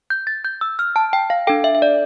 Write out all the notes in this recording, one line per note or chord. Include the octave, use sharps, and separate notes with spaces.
G6
A6
G6
E6
F6
A5
G5
F5
D4 A4 G5
E5
E5
D5